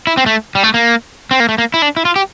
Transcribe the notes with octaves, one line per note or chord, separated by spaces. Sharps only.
E4
C4
A3
G3
A3
A#3
C4
A#3
A3
A#3
E4
D4
E4
F4
G4